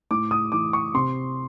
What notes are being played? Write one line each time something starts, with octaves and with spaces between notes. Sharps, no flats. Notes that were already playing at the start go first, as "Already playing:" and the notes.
A2 D6
D#6
E3 D6
C#6
C3 C6